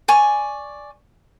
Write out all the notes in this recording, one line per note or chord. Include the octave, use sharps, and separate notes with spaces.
D5 G#5 C#6